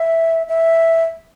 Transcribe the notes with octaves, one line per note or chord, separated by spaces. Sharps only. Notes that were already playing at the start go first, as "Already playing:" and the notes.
Already playing: E5
E5